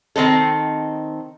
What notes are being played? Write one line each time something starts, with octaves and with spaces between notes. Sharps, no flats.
D#3 C4 D#4 A4